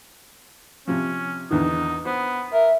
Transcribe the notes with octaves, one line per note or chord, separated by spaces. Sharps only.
C3 F3 C#4
E2 D3 D#3 D#4
B3 C5
A#4 E5